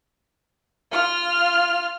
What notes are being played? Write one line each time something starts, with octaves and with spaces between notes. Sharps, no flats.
F4 F6